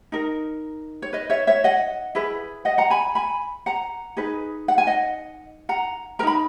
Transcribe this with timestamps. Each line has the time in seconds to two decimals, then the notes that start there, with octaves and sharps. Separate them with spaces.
0.12 D#4 A#4
1.02 C#5
1.13 B4 D#5
1.30 C#5 E5
1.47 C#5 E5
1.64 D#5 F#5
2.15 E4 G#4 B4
2.65 D#5 F#5
2.78 F#5 A#5
2.90 G#5 B5
3.15 G#5 B5
3.66 F#5 A#5
4.17 D#4 G#4 B4
4.68 F#5
4.78 G#5
4.87 D#5 F#5
5.69 F#5 A#5
6.19 A#4 A#5
6.23 D#4 B5